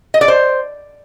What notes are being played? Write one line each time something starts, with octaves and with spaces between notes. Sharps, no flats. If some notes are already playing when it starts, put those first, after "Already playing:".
D#5
D5
C5